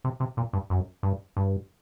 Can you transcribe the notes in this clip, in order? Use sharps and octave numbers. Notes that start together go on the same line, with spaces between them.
C3
C3
A#2
G2
F#2
G2
G2